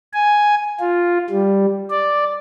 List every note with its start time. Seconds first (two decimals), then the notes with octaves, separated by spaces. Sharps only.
0.13 G#5
0.80 F4
1.30 G3
1.90 D5